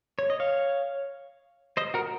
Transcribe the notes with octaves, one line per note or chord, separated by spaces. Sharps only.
C#5
D#5
C#5 F5
C5 D#5
F#4 A#4